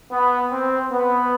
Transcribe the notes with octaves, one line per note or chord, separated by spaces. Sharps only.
B3
C4
B3